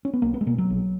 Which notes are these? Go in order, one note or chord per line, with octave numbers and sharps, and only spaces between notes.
C#4
B3
B1 A#3
B3
G#3
B2 A#3
F#3
A#1